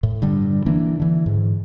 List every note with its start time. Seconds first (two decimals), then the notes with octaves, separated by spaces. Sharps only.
0.03 A2
0.22 G2 D3 G3
0.66 D3 E3 A#3 D4
1.00 D3 E3
1.26 G#2